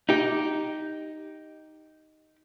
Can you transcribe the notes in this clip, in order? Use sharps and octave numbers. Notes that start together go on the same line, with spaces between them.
D#4 G4